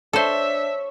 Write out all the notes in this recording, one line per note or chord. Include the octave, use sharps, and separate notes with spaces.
D4 A4 C5 C#5 E5